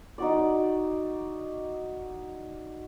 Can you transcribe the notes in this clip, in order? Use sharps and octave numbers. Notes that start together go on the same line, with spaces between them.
D#4 F#4 D5